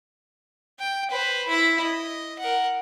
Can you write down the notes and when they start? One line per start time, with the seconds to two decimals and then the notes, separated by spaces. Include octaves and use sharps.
0.80 G5
1.10 B4 C5
1.48 E4 E5
1.82 D#5
2.39 A#4 F#5